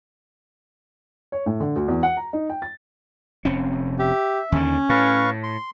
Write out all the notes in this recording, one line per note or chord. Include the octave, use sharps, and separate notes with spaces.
C#5
A2
D3
D2
E2
F#5
A#5
D#4
G5
A6
F1 C4 C#4
G4 E5
D#2 D3 D#3 C#4
A2 B4 F5 C#6
C6